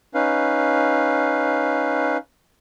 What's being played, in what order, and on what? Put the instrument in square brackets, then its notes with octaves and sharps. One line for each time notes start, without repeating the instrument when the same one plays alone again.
[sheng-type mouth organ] C#4 D#4 B4 F5